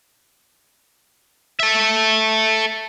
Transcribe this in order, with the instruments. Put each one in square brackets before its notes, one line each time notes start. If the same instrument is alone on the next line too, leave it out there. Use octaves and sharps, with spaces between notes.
[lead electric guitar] A4 E5